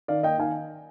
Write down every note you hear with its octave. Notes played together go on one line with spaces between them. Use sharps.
D#3 D5 F5
A#3 D#5 G5
D#3 F5 G#5